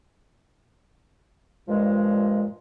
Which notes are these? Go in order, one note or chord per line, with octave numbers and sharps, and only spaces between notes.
G2 A#2 F3 G#3